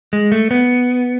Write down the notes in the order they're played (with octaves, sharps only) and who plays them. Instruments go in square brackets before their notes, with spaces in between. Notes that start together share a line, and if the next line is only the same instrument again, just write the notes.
[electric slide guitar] G#3
A3
B3